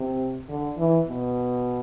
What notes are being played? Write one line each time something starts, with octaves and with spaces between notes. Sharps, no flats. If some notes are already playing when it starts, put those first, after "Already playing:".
Already playing: C3
D3
E3
B2